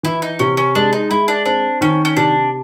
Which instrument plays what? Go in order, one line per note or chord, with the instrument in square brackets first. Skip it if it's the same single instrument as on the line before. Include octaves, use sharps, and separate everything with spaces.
[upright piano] E3 [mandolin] E4
[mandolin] D#4
[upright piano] C3 [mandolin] C#4
[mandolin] C#4
[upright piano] G#3 [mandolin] D4
[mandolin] D#4
[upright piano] G#3 [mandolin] E4
[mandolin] D4
[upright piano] C4 [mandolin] D4
[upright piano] D#3 [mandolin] C#4
[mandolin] C#4
[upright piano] C3 [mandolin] D4